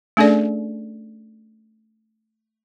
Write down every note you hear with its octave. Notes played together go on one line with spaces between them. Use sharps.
A3 C#4 D4 G#4 A4 D5